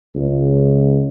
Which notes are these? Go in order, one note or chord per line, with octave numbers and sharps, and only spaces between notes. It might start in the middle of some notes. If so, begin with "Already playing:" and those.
C#2